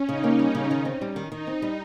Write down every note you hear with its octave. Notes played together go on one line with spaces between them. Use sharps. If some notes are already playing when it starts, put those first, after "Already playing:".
Already playing: C#4
C#3 D#4
A#3
G3
C#3
D#3
C4
G3
D#3
D#3 D#4
C4
G3